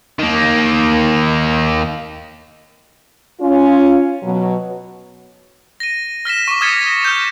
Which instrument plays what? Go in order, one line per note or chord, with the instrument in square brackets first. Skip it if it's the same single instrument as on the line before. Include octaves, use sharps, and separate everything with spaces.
[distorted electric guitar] D#3 A#3
[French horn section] C#4 F4
B2 F#3
[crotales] A#6 D#7
F6 A#6 B6 E7
C#6 D6
D#6 F6 G#6 A6 B6 C#7
A#6
F6 G6